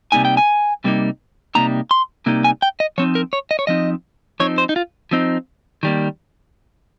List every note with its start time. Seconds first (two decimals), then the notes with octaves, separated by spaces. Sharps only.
0.12 C3 G3 A#3 D#4 G#5
0.25 G5
0.37 G#5
0.84 C3 G3 A#3 D#4
1.55 C3 G3 A#3 D#4 A#5
1.91 C6
2.26 C3 G3 A#3 D#4
2.44 G#5
2.62 G5
2.80 D#5
2.98 F3 C4 D#4 C#5
3.15 A#4
3.33 C#5
3.51 D#5
3.59 C#5
3.67 F3 C4 D#4 D#5
4.40 F3 C4 D#4 C#5
4.58 C5
4.69 D#4
4.76 F4
5.11 F3 C4 D#4
5.83 D#3 G3 A#3